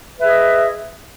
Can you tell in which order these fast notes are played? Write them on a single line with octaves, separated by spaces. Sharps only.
B4 E5 G#4 D#5